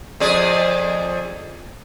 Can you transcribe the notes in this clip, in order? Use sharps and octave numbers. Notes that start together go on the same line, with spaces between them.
F2 G#4 D5